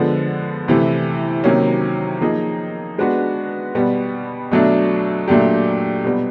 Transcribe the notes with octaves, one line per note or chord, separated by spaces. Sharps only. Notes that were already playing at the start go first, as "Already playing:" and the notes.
Already playing: D3 F3 G#3 B3
C3 E3 A3
C3 D#3 F#3 A#3 C#4
F3 A#3 D#4 G#4
G#3 B3 D4 F#4 B4
B2 G3 B3
B2 F#3 A3 D4
A#2 F#3 A3 D4 G4
B2 G3 B3